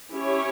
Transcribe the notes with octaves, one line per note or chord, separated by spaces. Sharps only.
C#4 E4 G4 C#5